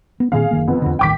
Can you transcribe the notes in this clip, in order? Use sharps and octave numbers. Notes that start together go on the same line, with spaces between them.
B3
A#2 D#3 C4 G#4 F5
F#1 D#3 A#3
F2 B3
E2 D3
D#1 A1 D#3 G5 D6 B6